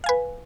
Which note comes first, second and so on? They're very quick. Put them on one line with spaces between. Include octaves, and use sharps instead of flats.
F5 G#5 B4